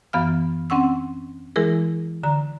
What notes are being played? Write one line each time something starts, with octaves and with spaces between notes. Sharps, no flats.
F#2 E3 B3 F5 F6
C4 C#4 F#5 C#6 E6
E3 G#3 E4 G#4 A#4
D3 A#5